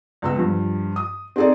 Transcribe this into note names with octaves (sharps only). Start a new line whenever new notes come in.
C#2 B3 E6
G2 F3
D#6
C4 D#4 G#4 A4 D5